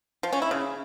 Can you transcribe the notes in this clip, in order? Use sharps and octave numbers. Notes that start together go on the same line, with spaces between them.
F3
C#4
E4
C#3